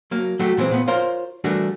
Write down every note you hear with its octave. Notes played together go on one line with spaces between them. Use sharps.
F#3 A#3
F#3 A3 G4
A#2 E3 G#3 C4
A#2 B3
F4 A#4 C5 C#5 F5
E3 G3 A3 D4 F#4 A#4